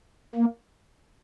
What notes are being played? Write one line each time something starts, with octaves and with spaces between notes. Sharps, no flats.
A#3